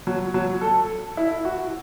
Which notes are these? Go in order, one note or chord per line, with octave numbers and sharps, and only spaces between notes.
F#3
F#3
A4
E4
F#4